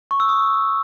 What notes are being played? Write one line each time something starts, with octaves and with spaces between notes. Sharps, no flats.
C#6
E6
D#6